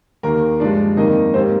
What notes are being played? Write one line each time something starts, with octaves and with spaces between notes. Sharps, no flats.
D#2 D#3 A#3 A#4
G2 F3 G#3 D4 D5
F2 D#3 A#3 D#4 D#5
G#2 G3 A#3 C4 C5